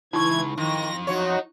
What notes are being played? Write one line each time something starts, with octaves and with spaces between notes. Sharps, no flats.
C#2 E3 D#4 E4 C#6 G#6
F2 D#3 A#6
F#3 D#4 F#4 C#5